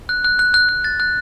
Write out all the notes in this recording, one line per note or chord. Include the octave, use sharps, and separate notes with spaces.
F#6
F#6
F#6
F#6
F#6
A6
F#6